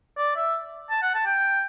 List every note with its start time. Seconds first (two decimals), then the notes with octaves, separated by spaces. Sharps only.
0.17 D5
0.36 E5
0.90 A5
1.02 F#5
1.14 A5
1.26 G5